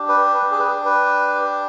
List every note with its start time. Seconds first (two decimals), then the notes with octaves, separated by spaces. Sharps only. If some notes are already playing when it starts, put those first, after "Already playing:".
Already playing: D4 G4
0.08 B4
0.34 B4
0.51 G#4
0.59 B4
0.85 B4